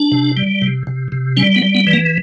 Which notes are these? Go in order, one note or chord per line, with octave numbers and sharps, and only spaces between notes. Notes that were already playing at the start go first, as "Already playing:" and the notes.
Already playing: D4
C3
G3
C3
C3
C3
G3 C#4
B3
G3
B3
E3
A#3